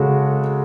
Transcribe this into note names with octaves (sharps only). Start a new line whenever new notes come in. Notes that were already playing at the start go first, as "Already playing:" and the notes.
Already playing: C#3 G#3 F#4 A4